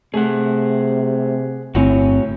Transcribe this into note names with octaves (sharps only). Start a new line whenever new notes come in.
C3 A3 G#4 F#5
G1 A2 C4 F#4 C#5 G#5